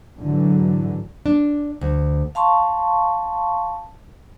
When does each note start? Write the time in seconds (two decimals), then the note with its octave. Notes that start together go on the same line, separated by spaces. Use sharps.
0.18 G#2 D3 E3 F#3
1.26 D4
1.81 D2
2.35 F5 A5 C6 C#6